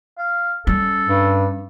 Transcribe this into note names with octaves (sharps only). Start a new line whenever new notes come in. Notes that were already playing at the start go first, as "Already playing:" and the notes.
F5
G3 C#4 A4
G2